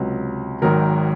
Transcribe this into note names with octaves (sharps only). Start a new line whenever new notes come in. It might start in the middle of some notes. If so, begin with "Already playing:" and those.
Already playing: C#2 C3 F#3
G#1 G#2 D#3 F#3 A#4